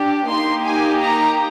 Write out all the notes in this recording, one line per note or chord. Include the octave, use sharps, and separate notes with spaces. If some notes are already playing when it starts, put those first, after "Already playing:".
Already playing: D4 G4
A#3 D#4 G4 C6
G#5
A#5